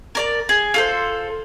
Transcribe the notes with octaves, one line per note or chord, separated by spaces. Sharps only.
A#4 D5 A5
G#4
F4 A4 C5